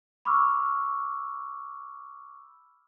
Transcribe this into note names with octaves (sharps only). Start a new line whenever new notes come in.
B5 C#6 D6 E6 F6